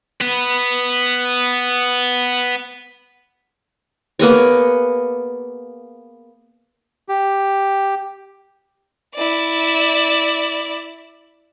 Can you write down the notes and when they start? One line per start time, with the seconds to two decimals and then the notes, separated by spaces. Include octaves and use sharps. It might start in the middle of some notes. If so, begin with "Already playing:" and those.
0.21 B3 B4
4.19 A#3 B3 G#4 C#5
7.09 G4
9.15 E4 D5